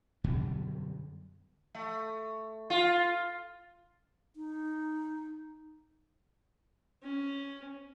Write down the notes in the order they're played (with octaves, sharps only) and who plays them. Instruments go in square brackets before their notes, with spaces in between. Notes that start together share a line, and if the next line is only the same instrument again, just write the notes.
[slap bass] F#2 B2 D3 G3
[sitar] A3
F4
[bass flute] D#4
[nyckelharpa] C#4